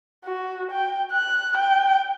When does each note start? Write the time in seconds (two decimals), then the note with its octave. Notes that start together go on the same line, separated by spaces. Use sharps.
0.24 F#4
0.71 G5
1.12 F#6
1.57 G5